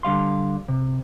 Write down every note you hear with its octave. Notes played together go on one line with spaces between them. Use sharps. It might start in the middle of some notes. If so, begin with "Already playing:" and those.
D3 G3 F5 C6
C3